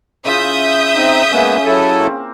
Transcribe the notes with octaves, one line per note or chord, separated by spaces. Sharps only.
C#3 E4 F4 E5 D#6 G6
C4 D#4
C#3 G#3 A#3 B3 C#4
F#3 E4 A4
A#3 C4